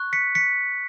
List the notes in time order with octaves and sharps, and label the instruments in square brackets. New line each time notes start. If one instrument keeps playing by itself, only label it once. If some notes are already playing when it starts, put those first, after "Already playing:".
Already playing: [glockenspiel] C#6 F#6
B6 C#7
B6 C#7